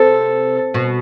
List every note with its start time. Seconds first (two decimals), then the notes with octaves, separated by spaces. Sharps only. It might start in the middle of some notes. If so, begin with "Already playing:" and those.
Already playing: C3 A4
0.74 B2